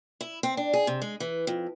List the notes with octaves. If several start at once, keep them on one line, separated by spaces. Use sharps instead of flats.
E4
C4
D4
G#4
C3
G#3
E3
F2